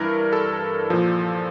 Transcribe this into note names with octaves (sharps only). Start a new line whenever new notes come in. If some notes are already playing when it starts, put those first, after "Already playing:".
Already playing: G2 E3 A#4
A4
A#2 F3